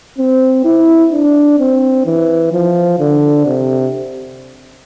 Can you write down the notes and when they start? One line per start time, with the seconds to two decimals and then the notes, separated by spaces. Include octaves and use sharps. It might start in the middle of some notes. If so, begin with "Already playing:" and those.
0.18 C4
0.64 E4
1.12 D4
1.59 C4
2.06 E3
2.52 F3
2.99 D3
3.46 C3